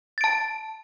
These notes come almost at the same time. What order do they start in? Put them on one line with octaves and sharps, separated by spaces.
A6 D7 A5